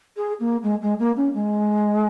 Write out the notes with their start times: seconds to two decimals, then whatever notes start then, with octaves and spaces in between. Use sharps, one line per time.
0.16 G#4
0.40 A#3
0.62 G#3
0.81 G#3
0.99 A#3
1.16 C#4
1.33 G#3